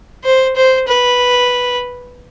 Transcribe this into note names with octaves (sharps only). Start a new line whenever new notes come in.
C5
C5
B4